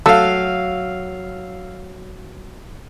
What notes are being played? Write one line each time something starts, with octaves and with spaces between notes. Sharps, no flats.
F#3 A3 F5 E6